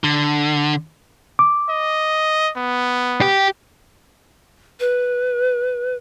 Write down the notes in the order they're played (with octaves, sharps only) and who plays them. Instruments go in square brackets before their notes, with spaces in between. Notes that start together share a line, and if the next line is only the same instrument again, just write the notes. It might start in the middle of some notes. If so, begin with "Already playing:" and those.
[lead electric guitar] D3
[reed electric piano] D6
[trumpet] D#5
B3
[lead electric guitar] G4
[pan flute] B4